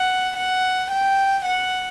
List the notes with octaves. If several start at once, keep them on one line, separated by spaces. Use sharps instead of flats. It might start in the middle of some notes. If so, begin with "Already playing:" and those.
Already playing: F#5
F#5
G5
F#5